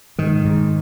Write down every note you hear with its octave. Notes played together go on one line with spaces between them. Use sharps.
G#2 D#3
G#2